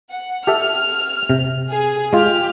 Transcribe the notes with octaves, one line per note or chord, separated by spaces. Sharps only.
F#5
G4 A4 E5 F6
C3
G#4
G#3 F4 G4 F6